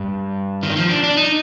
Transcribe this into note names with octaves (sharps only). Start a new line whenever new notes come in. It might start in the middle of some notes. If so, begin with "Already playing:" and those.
Already playing: G2
D#3
F3
D4
D4
D#4